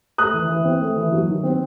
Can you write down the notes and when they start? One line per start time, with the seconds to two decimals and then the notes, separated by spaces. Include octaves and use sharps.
0.18 A3 D#6 F#6
0.33 E3
0.49 E3
0.65 C4
0.81 A3
0.96 E3
1.12 F#3
1.29 D#3
1.44 C4